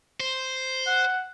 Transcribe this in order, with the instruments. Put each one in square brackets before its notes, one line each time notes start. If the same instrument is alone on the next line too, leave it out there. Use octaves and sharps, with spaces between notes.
[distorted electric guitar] C5
[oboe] F#5